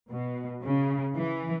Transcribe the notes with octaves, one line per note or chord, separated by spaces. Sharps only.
B2
C#3
E3